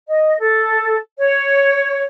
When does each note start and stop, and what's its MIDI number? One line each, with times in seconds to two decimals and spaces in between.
0.07 0.37 75
0.40 0.97 69
1.19 2.04 73